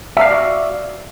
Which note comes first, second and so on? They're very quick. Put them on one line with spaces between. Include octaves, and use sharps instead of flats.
E5 F5 D5 F#4